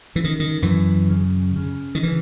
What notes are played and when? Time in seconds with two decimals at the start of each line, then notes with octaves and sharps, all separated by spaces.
0.15 C#3 E3
0.24 D#3
0.40 D#3
0.62 F#2 E3
1.10 C#3
1.56 C#3
1.95 D#3
2.03 C#3 E3